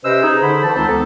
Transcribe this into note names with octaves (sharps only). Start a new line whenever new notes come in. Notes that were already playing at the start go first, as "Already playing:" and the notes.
C3 C#4 B4 C5 D#5 E6
D#4 G#4
D3 C5 B5
D3 E3 A5
C#2 D#3 C4 D#4 C5 A5
C#2 B3 A4